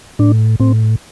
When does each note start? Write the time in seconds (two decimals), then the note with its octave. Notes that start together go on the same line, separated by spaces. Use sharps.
0.19 A2 D4
0.60 A2 C4